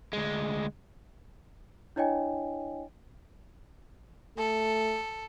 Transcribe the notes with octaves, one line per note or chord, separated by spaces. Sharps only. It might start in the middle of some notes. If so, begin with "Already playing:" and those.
D2 G#3
D4 E4 C#5 D#5 G5 G#5
A3 A4